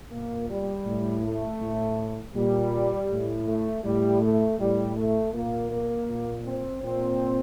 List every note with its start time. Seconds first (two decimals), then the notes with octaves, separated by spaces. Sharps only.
0.12 A#2 A#3
0.49 G3
0.86 A2
1.24 A3
1.61 A2
2.35 A#2 G3
3.10 A2
3.47 A3
3.84 A2 G3
4.21 A3
4.59 A2 G3
4.96 A3
5.33 A#2 A#3
5.71 A#3
6.08 A#2
6.46 C4
6.83 A#2 C4